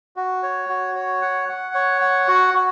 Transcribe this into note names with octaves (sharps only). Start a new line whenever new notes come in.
F#4
C#5
F#4
C#5
F#5
F#5
C#5
F#5
F#4
F#4